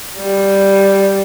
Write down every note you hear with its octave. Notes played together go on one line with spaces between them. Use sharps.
G3